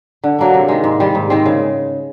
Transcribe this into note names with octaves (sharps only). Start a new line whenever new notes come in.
D3
F#3 A#3 D4
C3
D#3 G#3
G#2
D#3 G3
G#2
D#3 G#3 C4
C#3